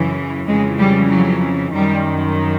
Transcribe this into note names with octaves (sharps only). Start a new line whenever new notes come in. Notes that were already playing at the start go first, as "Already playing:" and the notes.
Already playing: F#2 C#3 E3
F2 C#3 E3 G#3
G3
F#3
F#2 D#3 G3